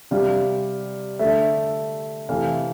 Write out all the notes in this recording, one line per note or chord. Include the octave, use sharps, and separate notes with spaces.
C3 G3 F5
D3 A3 E5
C3 E3 A3 F5